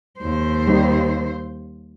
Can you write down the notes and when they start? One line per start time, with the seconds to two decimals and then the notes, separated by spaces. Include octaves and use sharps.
0.20 D#2 C5
0.67 G3 D#4